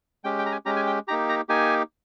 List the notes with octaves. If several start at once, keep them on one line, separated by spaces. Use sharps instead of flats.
G#3 C#4 G4 G5
G5
A#5
G#5
G#3 C#4 G4 A#5
G#5
G5
A#3 D#4 G4 A#5
A#5
A#3 D#4 G4 G#5